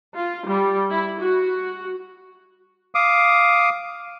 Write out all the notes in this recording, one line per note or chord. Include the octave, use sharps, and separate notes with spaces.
F4
G3
E4
F#4
F5 D6 D#6